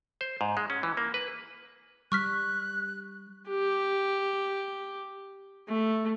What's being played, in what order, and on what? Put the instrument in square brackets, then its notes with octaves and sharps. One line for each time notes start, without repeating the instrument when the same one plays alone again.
[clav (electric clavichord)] C5
G#2
G#3
C#4
E3
A#3
B4
[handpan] G3 [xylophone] C#6 F6 B6 [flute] F#6
[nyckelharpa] G4
A3